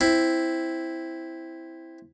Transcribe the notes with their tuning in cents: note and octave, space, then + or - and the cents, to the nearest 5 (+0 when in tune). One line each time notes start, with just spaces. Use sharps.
C4 +0 E4 +0